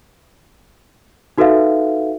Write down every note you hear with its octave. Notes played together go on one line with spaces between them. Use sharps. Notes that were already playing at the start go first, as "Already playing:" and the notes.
D#4 F#4 A4 B4 E5 F5